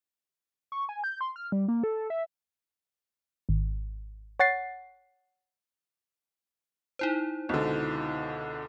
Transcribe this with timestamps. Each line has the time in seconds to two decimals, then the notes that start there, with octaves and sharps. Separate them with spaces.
0.72 C#6
0.89 G#5
1.04 G6
1.21 C6
1.36 F6
1.52 G3
1.68 A#3
1.84 A4
2.10 E5
3.49 G#1
4.39 C#5 F#5 A6 C7
6.99 D#4 E4 C5
7.49 C#2 B2 D3